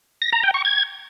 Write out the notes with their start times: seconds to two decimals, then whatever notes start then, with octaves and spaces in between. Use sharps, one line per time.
0.22 A#6
0.33 A#5
0.43 G5
0.54 C#6
0.65 G#6